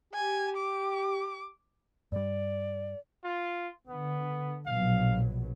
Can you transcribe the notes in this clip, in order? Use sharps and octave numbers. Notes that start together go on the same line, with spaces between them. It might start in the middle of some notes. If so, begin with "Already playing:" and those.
G4 G#5
D6
G2 G3 D5
F4
D3 B3
A#1 B2 F#3 F5